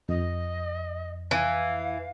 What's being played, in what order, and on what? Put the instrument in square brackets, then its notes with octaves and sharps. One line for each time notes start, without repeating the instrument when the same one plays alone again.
[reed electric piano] F2 [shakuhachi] D#5
[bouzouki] E3 [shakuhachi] F5